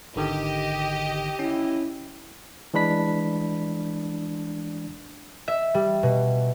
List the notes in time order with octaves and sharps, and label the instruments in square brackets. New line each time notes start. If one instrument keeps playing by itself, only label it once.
[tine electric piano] G#1 D3 D#3 [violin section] G4 D#5
[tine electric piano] C#4 [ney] E4
[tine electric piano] E3 G#3 D4 B5 B6
[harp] E5
G3
B2